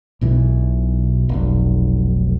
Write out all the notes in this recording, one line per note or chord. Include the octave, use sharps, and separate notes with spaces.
B1 B2 E3
F1 B1